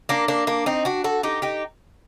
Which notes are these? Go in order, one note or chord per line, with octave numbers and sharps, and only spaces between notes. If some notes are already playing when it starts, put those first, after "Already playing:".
A#3 D4
A#3 D4
A#3 D4
C4 D#4
D4 F#4
F#4 A4
D#4 G4
D#4 G4